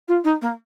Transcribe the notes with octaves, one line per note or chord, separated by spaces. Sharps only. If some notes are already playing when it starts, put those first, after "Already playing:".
F4
D#4
A#3